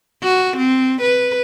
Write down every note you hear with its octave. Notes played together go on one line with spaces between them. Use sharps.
F#4
C4
B4